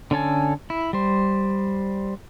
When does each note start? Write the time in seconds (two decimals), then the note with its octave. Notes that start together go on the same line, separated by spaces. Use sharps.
0.11 D3 C#4 A4 G#5
0.70 E4
0.93 G3 C5